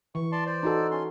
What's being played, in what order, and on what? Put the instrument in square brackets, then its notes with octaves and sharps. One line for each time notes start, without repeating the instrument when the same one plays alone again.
[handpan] E3 [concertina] C#6
[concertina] D5 A5 C6
C5 D5
[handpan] D#4 F#4 A4
[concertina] C#4 C6